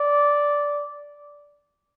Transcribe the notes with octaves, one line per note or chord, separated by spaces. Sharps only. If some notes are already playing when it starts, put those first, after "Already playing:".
Already playing: D5